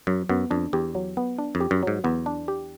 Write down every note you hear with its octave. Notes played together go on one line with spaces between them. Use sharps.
F#2 F#3
F#2 B3
F2 D4
E2 G4
F#3
B3
D4
F2
G4
F#2
G#2 F#3
E2 B3
D4
G4